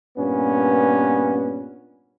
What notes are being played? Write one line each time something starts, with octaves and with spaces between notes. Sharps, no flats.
G2 A#2 B3 C#4